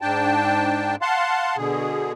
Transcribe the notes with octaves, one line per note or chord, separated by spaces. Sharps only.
G#2 D4 G5 A5
F5 F#5 A5 C6
B2 D3 G#4